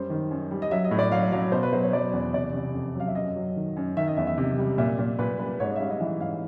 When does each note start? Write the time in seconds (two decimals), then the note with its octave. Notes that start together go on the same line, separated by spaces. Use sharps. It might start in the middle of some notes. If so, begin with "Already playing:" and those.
Already playing: F#2 G3 C5
0.10 D#3
0.31 F#2
0.51 G3
0.62 D#5
0.71 F#3 E5
0.84 D#5
0.91 A2
0.99 D5
1.12 F#3 F5
1.32 F#3 F5
1.52 B2 C5
1.63 B4
1.73 F#3 C5
1.83 C#5
1.93 F#3 D5
2.13 E2
2.34 C3 D5
2.54 C3
2.74 F2
2.95 F#3 F5
3.07 E5
3.15 F#2 D#5
3.36 F#3
3.56 D#3
3.76 F#2
3.97 D#3 E5
4.07 D#5
4.17 E2 E5
4.27 E5
4.38 C3
4.58 G3
4.78 A#2 E5
4.99 A#2
5.19 A#2 B4
5.39 G3 B4
5.60 G#2 C#5
5.70 D#5
5.76 E5
5.80 G3 F5
5.90 D#5
6.00 E3 E5
6.21 G#2 F5